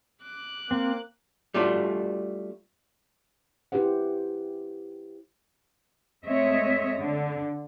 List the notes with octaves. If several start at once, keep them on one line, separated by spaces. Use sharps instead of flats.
D6 F#6
A#3 C4
G3 A3 D4 F4 F#4
E4 G4 B4 C5 F#5
G#3 A3 C4 C#5 D#5 E5
D3